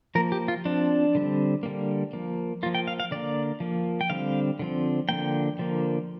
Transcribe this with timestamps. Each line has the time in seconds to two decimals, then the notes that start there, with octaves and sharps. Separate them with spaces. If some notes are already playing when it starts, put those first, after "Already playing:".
0.15 F3 A#3 A#4
0.32 G4
0.48 F4
0.65 F3 C4 D4
1.15 D3 G3 C4
1.63 D3 G3 A#3
2.13 F3 A#3
2.63 A#3 F4
2.66 F3
2.75 G5
2.88 F5
3.00 F5
3.11 D3 A#3 D5
3.60 F3 A#3
4.01 G5
4.10 D3 G3 C4 F5
4.59 D3 F3 C4
5.09 D3 F3 A#3 G5
5.59 D3 F3 A#3